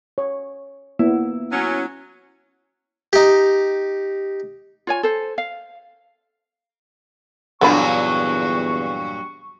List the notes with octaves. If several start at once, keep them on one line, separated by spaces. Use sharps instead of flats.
C#5
A#3 B3 E4
F#3 C#4
D#4 G4
F4 C#5 G#5
A4 C5
F5
E2 G2 A#2 D3 F#3 F4 B5 C#6